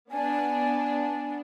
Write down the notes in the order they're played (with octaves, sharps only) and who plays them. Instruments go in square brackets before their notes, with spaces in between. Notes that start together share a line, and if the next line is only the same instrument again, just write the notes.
[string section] B3 D4 [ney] G#5